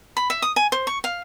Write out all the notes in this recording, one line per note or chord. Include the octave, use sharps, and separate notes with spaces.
B5
E5
D#6
G#5
C5
C#6
F5